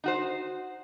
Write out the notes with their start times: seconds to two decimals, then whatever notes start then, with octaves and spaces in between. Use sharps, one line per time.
0.04 D#4 F#4 C5